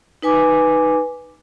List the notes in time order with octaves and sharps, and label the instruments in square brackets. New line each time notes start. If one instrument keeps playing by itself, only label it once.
[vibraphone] D#4 B4 G#5 D6